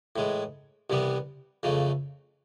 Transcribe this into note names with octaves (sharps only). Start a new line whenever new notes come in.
A2 E3 G#3
C2 C3 E3 G3 B3
F2 C#3 E3 A3